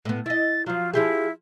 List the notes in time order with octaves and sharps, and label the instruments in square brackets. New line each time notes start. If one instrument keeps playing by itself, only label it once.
[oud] A2 B3
[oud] E4 D#5 [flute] A6
[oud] F3 F#3 [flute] F4
[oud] F3 G4 G#4 [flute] E4